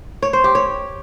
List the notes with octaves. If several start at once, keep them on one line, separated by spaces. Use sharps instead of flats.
C#5
C5
G4
C#5